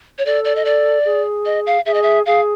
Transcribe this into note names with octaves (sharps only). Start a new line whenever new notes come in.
C#5
A4 D5
D5
D#5
D5
G#4
D#5
F5
G#4 E5
D#5
E5
G#4 F5